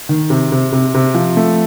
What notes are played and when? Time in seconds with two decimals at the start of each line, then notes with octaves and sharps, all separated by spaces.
0.09 D#3
0.30 C3
0.52 C3
0.73 C3
0.95 C3
1.15 F3
1.37 A3